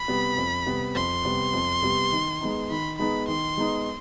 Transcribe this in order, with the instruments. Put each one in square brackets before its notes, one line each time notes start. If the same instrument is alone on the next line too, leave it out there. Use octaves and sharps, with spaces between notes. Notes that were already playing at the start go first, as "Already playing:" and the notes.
Already playing: [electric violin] B5
[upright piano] C3 G3 B3
F2
C3 G3 B3
[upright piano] F2 [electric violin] C6
[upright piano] C3 G3 B3
F2
C3 G3 B3
D#3
G#3 B3 D#4
[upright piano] D#3 [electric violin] B5
[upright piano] G#3 B3 D#4 [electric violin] B5
[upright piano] D#3 [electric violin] C6
[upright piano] G#3 B3 D#4